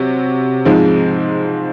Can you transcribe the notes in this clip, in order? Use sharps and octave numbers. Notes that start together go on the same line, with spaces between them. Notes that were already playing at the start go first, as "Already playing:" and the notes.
Already playing: C3 F#3
G#2 F3 G#3 C4 D#4